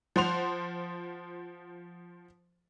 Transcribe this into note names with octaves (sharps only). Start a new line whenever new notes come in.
F3 C5 F#5 C6 F7